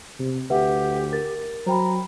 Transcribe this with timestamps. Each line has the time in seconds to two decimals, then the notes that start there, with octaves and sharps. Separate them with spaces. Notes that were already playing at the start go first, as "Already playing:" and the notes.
0.19 C3
0.50 D2 G4 B4 E5 F#5
1.12 A#4 A6
1.67 F#3 C5 G5 A#5 B5